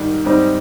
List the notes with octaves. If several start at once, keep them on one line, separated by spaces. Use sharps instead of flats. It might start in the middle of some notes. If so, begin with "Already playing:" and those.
Already playing: G#2 D#3 G3
G#2 G3 C4 D#4